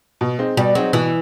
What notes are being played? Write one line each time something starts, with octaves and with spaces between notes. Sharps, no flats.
B2
G#3 C4 D#4
B2 G3
F#3 G#3 C4 D#4
B2 E3